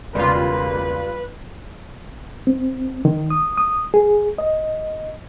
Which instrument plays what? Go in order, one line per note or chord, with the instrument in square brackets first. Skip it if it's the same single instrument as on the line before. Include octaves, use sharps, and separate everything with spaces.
[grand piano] E1 C#3 [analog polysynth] G3 F4 [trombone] A#3 [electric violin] B4
[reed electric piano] C4
D#3
D#6
D#6
G#4
D#5